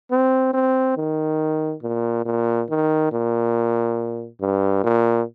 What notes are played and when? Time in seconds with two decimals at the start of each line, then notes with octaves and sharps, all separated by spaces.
0.11 C4
0.54 C4
0.97 D#3
1.82 A#2
2.26 A#2
2.69 D#3
3.12 A#2
4.41 G2
4.84 A#2